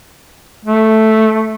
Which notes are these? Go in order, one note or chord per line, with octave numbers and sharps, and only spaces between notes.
A3